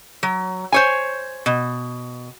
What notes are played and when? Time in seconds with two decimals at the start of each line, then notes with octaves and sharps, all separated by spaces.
0.23 F#3
0.72 C5 C#5 G#5
1.46 B2